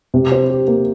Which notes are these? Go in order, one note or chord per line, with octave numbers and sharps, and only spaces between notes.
C3
C5
G4
A#3